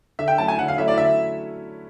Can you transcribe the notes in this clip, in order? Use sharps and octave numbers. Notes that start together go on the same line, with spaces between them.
D3 E5
G5
F#3 A3 C#4 E4 A5
G#5
D3 F#5
F5
F#3 A3 C#4 E4 E5
D5
D3 E5